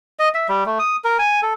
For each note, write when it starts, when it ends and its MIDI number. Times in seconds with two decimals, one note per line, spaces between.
0.19 0.29 75
0.34 0.47 76
0.49 0.64 55
0.66 0.79 57
0.79 0.96 87
1.04 1.17 70
1.19 1.41 80
1.42 1.54 69